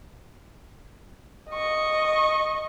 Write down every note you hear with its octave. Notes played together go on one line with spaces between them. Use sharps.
D#5 C#6